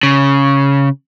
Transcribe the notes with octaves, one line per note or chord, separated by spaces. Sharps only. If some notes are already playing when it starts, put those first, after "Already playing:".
C#3